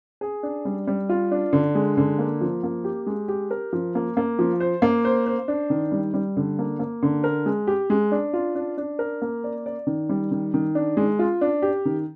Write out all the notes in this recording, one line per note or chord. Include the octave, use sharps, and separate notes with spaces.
G#4
D4
G3
G3
F4
D4
D3
G#3
D3
A#3
F3
A#3
G4
G#3
G4
A#4
F3
A#3
A#3
F3
C5
A#3
C5
C5
D4
D#3
G3
G3
D3
A#3
A#3
D3
A#4
G#3
G4
G#3
D4
F4
D4
D4
A#4
A#3
D5
D5
D#3
G3
D#3
D#3
D4
G#3
F4
D4
G4
D#3